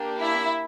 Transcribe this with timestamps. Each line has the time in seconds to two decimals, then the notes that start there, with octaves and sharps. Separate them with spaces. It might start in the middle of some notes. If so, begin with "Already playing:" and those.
Already playing: A#3 D4 G4
0.19 E4 E5